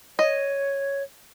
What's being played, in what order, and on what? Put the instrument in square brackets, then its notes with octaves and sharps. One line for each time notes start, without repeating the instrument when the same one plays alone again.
[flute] C#5 [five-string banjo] D#5